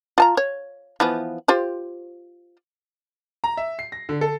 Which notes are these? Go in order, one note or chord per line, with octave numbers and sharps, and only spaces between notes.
F4 A5 A#5
C#5
E3 F3 B3
F4 G4 C5
A#5
E5
C7
A#6
D3
A4